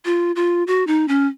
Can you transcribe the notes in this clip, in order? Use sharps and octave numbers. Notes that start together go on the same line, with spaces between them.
F4
F4
F#4
D#4
C#4